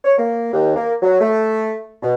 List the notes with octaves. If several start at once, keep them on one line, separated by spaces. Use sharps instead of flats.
C#5
A#3
D#2
A#3
F#3
A3
B2